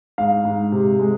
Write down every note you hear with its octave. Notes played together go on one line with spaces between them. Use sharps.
G#2 F5
G#2
C3
G#3